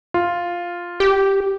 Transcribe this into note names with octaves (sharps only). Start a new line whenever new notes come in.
F4
G4